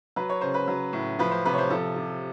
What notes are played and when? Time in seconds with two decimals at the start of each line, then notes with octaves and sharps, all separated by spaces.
0.16 F#3 B4
0.30 C#5
0.41 C#3 C5
0.54 B4
0.68 F#3
0.93 A2
1.19 F3 B4
1.31 C5
1.45 C3 B4
1.54 C#5
1.58 C5
1.70 F3 A4
1.96 C3